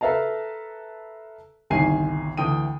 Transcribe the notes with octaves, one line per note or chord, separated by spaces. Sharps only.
A4 B4 E5 F5 A5 A#5
G1 C2 D#3 G#5 C7 D#7
D2 E3 G5 D#6 D#7